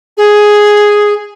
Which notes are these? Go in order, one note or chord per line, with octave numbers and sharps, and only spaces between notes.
G#4